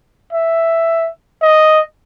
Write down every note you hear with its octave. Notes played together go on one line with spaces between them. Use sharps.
E5
D#5